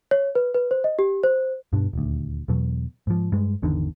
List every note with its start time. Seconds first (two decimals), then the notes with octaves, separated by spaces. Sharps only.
0.11 C#5
0.35 B4
0.54 B4
0.71 C5
0.84 D#5
0.99 G4
1.23 C5
1.73 G2 B2 D4
1.93 D#1 D2
2.48 E2 B2 F#3
3.07 G#2 F3
3.32 G2 G#3
3.62 G#1 E2 D3 D#3